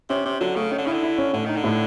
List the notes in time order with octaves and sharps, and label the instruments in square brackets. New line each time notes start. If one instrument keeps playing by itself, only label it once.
[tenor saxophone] C3 [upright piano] C#4
[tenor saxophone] C3 [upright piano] C#4
[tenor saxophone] D3 [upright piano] F#3
[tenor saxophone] C#3 [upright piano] A3
[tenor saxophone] D#3 [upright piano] C#4
[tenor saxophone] D3
[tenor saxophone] C#3 [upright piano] E4
[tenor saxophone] D3
[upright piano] E4
C#4
[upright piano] A2 [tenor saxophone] D3
[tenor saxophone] D#3 [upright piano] D#4
[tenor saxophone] D3
[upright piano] A2